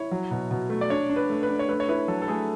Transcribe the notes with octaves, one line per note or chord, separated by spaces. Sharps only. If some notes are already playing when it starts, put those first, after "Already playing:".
Already playing: E4 C#5
F#3
B2
B2
A3
D5
D4 C#5
D4
B4
A3
B4
D4
C#5
A3 B4
C#5
E4 B4
F#3 A4
A4
A3 G#4